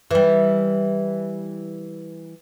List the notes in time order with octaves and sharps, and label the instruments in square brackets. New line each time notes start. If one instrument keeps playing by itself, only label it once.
[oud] E3 G3